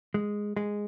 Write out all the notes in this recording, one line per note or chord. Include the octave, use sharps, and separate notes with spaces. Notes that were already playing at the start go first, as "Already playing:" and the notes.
G#3
G#3